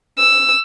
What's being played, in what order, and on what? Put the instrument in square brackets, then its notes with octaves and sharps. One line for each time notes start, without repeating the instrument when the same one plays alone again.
[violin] E6